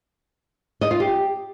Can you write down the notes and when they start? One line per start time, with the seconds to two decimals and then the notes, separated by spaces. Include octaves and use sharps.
0.81 D#5
0.91 F4
1.00 G4